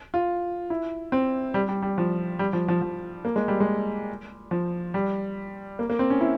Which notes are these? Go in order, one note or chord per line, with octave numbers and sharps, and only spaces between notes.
F4
E4
C4
G3
G3
G3
F3
G3
F3
F3
F3
A#3
G#3
G3
G#3
F3
G3
A#3
A#3
C4
C#4
E4